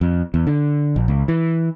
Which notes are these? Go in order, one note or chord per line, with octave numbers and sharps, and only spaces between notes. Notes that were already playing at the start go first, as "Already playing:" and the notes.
F2
E2
D3
A#1
C#2
E3